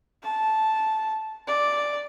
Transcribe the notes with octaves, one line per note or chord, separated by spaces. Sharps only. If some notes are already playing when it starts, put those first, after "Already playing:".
A5
D5